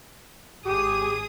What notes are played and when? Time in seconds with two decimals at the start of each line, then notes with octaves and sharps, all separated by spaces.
0.66 G#1 G4 G#4 D#6